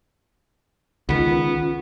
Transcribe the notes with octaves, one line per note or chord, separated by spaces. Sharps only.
C#2 D#3 B3 C#4 F4